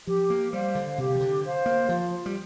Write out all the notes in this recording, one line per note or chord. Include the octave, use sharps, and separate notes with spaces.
F3 G4
A#3
G3 C5 F5
D3
C3 G4
F3
D3
C5 F5
A#3
F3 F4
G3